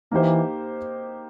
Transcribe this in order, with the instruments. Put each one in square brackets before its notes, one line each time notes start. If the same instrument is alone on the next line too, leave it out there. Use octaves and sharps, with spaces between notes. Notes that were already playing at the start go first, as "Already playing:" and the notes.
[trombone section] E3 [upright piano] A#3 D#4 G4 C5